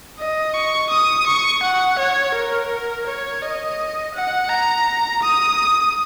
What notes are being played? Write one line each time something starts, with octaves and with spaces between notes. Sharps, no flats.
D#5
C#6
D#6
C#6
F#5
C#5
A#4
C#5
D#5
F#5
A#5
D#6